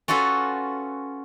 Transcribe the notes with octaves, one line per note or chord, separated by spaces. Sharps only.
C#4 F4 F#4 A4 B4